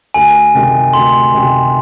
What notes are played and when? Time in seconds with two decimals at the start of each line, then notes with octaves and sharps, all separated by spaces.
0.14 D2 G#5
0.54 C3 D#3 G#3
0.94 D2 C6
1.34 C3 D#3 G#3